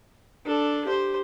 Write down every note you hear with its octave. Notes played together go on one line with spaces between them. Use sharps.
D4 A4
G4 C5